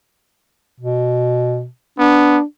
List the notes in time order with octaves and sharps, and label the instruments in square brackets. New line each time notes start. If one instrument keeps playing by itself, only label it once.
[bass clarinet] B2
[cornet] B3 [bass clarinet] D4